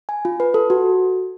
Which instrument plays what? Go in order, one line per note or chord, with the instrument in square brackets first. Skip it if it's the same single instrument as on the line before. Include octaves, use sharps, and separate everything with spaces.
[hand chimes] G#5
F4
B4
A4
F#4